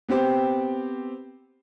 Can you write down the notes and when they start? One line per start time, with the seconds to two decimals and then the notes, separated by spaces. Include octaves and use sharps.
0.09 B3 C4 G4 C5